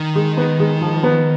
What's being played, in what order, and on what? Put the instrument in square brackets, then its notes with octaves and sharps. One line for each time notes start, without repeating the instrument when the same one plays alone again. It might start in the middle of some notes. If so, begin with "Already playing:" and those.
Already playing: [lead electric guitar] D#3
[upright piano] G#3
B3
G#3
F3
B3